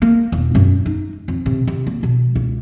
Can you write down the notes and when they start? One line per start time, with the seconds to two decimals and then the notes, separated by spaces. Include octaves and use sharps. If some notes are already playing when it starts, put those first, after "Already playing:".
0.02 A#3
0.32 E1
0.55 F#2
0.86 D#4
1.28 F2
1.46 C3
1.67 C3
1.87 A#3
2.03 B2
2.35 C#2